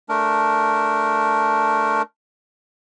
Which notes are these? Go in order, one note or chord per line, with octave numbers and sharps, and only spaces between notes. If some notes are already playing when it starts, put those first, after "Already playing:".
A3 D4 A#4